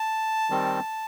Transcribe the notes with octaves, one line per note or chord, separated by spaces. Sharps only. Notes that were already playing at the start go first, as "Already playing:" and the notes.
Already playing: A5
D#3 G3 C4